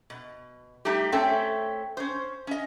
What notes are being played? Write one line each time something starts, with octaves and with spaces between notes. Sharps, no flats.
B2
G3 A3 D#4 G4
A3 C4 C#4 A4 G5
C#4 C5
C#4 D#5